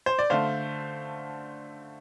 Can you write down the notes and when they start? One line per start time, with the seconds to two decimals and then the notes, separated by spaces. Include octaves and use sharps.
0.06 C5
0.19 D5
0.30 D3 A3 C5 F5